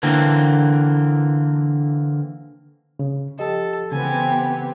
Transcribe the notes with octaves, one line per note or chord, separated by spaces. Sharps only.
D3 E3 A#3 C4
C#3
F3 G4 A4 D#5
C#3 E3 B3 C4 G4 G#5